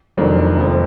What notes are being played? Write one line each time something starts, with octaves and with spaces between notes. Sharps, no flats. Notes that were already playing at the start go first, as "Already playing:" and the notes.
F1 F2 D#3 F#3 D4
F1 F2 F3